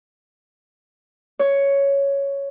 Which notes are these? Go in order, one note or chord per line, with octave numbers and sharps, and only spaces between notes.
C#5